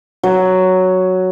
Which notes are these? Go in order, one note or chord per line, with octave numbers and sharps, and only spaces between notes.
F#3